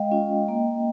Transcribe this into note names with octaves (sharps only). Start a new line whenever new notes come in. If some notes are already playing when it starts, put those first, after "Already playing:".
Already playing: G#3 D#5 F5 G5
C#4 F4
A#3